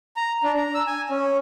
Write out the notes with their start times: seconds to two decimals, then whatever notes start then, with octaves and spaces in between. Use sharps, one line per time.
0.16 A#5
0.43 D4
0.57 A#5
0.75 E6
0.87 G#5
1.10 C#4